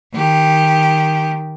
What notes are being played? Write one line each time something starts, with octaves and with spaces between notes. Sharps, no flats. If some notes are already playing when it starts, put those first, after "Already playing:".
D#3 G4